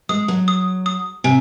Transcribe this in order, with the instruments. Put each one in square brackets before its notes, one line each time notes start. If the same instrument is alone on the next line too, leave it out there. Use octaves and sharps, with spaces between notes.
[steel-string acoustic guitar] G#3 [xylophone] D#6
[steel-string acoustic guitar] F#3
[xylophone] D#6
D#6
[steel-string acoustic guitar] C3 [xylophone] G#5